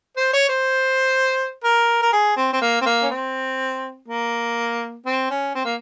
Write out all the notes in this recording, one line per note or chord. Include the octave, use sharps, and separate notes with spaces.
C5
C#5
C5
A#4
A#4
G#4
C4
C4
A#3
C4
A#3
C#4
C4
A#3
C4
C#4
C4
A#3